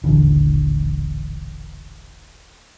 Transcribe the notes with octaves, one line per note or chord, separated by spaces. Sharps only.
D#1 A1 D3 E3